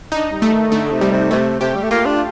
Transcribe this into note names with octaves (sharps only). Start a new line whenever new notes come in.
D4 D#4
G3
A3
D#3
D3 A3
C3
G3
C3
C3 A3
C3 G4
G3
A3
A#3 F4
D4